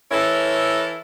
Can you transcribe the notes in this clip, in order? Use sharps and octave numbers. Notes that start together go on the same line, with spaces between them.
E3 E4 A4 A#4 C#5